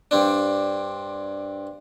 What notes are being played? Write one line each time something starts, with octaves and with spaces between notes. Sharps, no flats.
G2 C4 D4